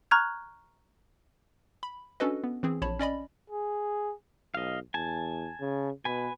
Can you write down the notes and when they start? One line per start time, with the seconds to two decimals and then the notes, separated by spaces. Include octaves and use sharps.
0.11 A#5 C#6 F6 F#6 G#6
1.83 B5
2.20 C#4 D4 F#4 A4 B4 D#5
2.44 B3
2.63 E3 C4 G#4
2.82 A#1 C#5 A5 B5
2.99 C#4 D5 D#5 B5
3.50 G#4
4.55 B1 D#5 F5
4.94 E2 G#5 A5
5.61 C#3
6.05 B2 B4 G#5